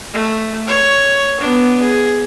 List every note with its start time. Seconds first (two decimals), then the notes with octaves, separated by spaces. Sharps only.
0.13 A3
0.68 C#5
1.40 B3 D4
1.81 G#4